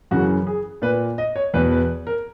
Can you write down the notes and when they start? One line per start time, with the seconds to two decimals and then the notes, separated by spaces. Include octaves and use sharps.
0.11 F#2 C#3 E3 F#4
0.47 G#4
0.82 A#2 B4
1.18 D#5
1.36 C#5
1.54 E2 B2 B4
1.71 B4
2.07 A#4